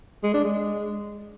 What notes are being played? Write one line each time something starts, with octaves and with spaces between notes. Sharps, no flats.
G#3
D4
G#3